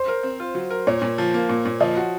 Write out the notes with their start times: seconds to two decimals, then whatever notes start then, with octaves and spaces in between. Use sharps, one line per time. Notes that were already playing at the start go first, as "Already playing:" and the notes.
Already playing: C5
0.08 A#4
0.23 C4
0.40 F4
0.55 F#3
0.70 A#4
0.87 A#2 C#5
1.02 A#2
1.18 F3
1.34 A#3
1.49 A#2
1.65 A#2
1.80 F3 D#5
1.97 F#4